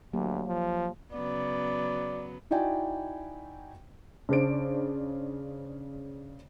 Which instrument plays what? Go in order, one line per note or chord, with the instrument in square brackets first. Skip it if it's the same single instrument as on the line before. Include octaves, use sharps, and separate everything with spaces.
[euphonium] D2 [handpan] F#3 A#3 G4
[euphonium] F3
[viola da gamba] C#3 F#3 B3 [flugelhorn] D5
[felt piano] D#4 E4 F#4 D5 G5 G#5
[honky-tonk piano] C#3 D4 C5 D7